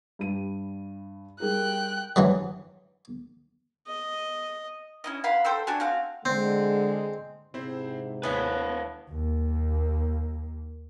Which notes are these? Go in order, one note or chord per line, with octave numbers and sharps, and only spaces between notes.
G2 G3 D#7
G3 G#4 A#4 G5 F#6
E3 F#3 G3
D#5
C#4 E4 D#5
F5 F#5 B5 C6
A4 C5 G5 E6
D4 F#4 G#5
C4 F#4 F5
D3 G#3 C4
G#2 C3 C4 E4 C5
D#2 G#3 B3 E4 B4 C#5 E5 F5
D#2 A#3